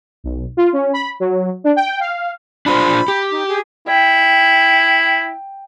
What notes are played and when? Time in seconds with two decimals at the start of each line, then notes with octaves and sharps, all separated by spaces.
0.24 B1
0.57 F4
0.73 C#4
0.93 B5
1.20 F#3
1.64 D4
1.76 G5
2.00 F5
2.66 D4 F4 C5 B5
3.08 G4
3.31 D#4
3.48 G#4
3.88 E4 G5